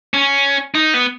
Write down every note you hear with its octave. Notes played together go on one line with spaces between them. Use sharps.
C#4
D#4
B3